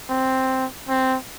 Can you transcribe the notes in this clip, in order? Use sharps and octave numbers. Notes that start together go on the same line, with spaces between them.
C4
C4